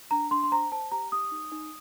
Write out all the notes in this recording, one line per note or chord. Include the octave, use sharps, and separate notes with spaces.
D4 A#5
D4 C6
C6
C5 A#5
C5 A5
G4 A#5
G4 D#6
D#4
D#4